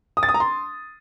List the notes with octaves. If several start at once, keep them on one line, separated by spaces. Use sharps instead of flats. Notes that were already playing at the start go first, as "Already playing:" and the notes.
D#6
A6
D#6
A#5
C6